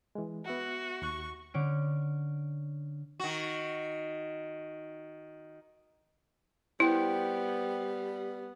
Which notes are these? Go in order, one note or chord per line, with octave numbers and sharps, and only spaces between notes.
E3 G#3
B3 F#4 E5 F#5
D#2 C#6 F#6
D3 C#4 D7
D#3 F#4
G3 B3 E4 C5 G5